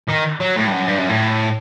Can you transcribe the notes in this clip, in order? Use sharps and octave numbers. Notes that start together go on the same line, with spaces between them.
D#3
F#3
A2
G2
F#2
G2
F#2
A2